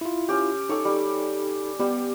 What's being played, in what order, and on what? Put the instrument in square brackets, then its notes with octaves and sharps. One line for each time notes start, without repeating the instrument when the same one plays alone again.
[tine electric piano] E4 F4
[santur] C#4 G4
[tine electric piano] D#4 A4 [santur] G4 C#5
[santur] G3
[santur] G3 [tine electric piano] B3 G4